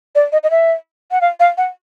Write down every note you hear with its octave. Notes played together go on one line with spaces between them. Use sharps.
D5
D#5
D#5
E5
F#5
F5
F5
F#5